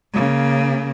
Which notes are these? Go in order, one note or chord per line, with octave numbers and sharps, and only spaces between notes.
C#3 A#3